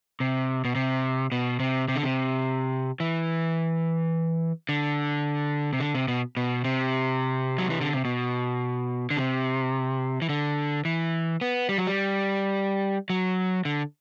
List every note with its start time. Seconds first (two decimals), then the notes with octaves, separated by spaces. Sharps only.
0.20 C3
0.65 B2
0.75 C3
1.32 B2
1.60 C3
1.88 C3
1.96 D3
2.03 C3
3.00 E3
4.69 D3
5.73 C3
5.80 D3
5.95 C3
6.08 B2
6.37 B2
6.64 C3
7.58 F#3
7.70 E3
7.81 D3
7.93 C3
8.05 B2
9.11 D3
9.17 C3
10.22 E3
10.29 D3
10.85 E3
11.41 B3
11.69 G3
11.78 F#3
11.87 G3
13.10 F#3
13.65 D3